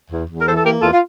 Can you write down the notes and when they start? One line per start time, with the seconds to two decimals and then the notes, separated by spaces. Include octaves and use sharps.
0.11 E2
0.28 E2
0.41 A#4
0.46 E3 A4 C5
0.57 A4
0.64 A#3 G4 A#4
0.81 E2 F4 A4
0.93 F4